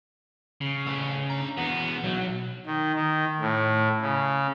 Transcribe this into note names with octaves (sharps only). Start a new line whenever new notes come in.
C#3
A3 B4
D4 A#5
E2 B3 F#4
B1 F#3
D#3
D#3
A2
C#3